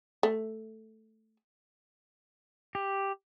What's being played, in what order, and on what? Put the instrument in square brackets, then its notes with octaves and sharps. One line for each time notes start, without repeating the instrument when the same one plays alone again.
[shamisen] A3
[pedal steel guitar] G4